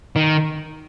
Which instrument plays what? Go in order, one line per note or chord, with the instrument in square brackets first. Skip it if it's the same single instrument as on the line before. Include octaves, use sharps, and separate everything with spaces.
[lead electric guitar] D#3